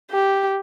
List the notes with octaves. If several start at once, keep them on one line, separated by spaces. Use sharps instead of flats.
G4